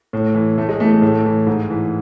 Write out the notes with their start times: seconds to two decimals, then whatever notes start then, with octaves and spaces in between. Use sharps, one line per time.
0.13 A2
0.35 E3
0.57 A2 A3
0.69 G#3
0.80 E3 A3
0.91 A3
1.02 A2
1.25 E3
1.47 G#2
1.70 E3